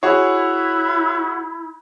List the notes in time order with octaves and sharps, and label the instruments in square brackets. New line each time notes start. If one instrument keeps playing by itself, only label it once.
[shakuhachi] E4 [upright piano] F#4 G#4 C#5